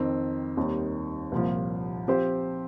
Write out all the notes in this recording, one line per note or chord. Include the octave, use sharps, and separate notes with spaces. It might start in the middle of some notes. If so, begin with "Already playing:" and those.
Already playing: F2 D#3 C4
D#2 D#3 G3 C4 D#4
C2 A#2 F3
F3 C4 G4 C5